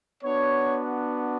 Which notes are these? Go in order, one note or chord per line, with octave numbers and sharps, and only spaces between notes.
B3 D4 F#4 C#5